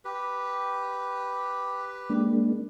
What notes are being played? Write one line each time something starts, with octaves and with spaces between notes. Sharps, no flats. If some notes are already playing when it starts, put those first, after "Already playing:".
G4 B4
G#3 A#3 D4